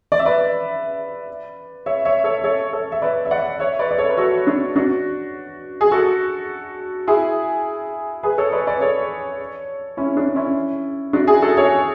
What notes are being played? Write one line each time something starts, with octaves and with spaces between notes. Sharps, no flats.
D5
E5
B4 D5
C#5 E5
C#5 E5
A4 C#5
A4 C#5
A4 C#5
E5
B4 D5
E5
D5 F#5
C#5 E5
B4 D5
D5
A4 C#5
B4
F#4 A4
D4 F#4
D4 F#4
G#4
F#4 A4
E4 G#4
G#4 B4
A4 C#5
B4 D5
B4 D5
A4 C#5
C#4 E4
D4
C#4 E4
D4 F#4
E4 G#4
F#4 A4
A4 C#5